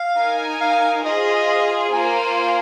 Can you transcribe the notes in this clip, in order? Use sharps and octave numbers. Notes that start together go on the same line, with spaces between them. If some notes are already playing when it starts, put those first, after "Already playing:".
Already playing: F5
D#4 A#4 G#5
F5
F4 G#4 C5 D#5
A#3 F4 C5 G#5